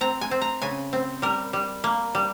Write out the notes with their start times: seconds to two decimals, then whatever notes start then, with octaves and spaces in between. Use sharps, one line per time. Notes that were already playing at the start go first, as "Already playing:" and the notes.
0.01 C4 A#5
0.21 G#5
0.31 C4
0.42 A#5
0.62 C#3 G#5
0.93 C4
1.22 G3 A#4
1.53 G3
1.84 A#3
2.15 G3